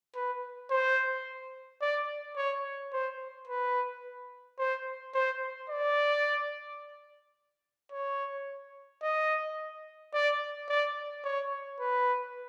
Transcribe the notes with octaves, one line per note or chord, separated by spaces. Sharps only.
B4
C5
D5
C#5
C5
B4
C5
C5
D5
C#5
D#5
D5
D5
C#5
B4